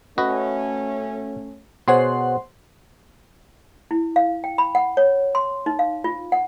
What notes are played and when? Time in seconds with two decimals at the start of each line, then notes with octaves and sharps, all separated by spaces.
0.18 A3 C#4 F#4 B4 D#5
1.88 B2 G#4 C5 C#5 F#5 C6
3.91 E4
4.16 F5
4.44 G5
4.58 B5
4.75 F#5
4.97 C#5
5.35 C6
5.66 D#4
5.79 F5
6.04 F4
6.32 F#5